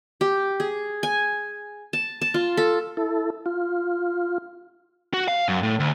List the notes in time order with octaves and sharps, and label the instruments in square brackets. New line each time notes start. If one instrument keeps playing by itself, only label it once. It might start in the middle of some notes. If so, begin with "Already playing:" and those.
[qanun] G4
G#4
G#5
A5
A5
F4
A4
[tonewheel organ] E4 A4
F4
[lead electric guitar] F#4
F5
F#2
A2
D2